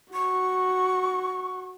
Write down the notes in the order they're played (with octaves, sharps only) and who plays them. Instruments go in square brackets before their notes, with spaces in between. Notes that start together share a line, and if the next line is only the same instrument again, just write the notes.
[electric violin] F#4 [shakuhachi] C#6